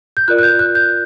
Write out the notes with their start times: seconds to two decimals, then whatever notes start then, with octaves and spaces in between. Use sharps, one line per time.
0.17 G6
0.28 F4 A#4 D5 F#6
0.39 F#6
0.43 G6
0.59 F#6
0.75 G6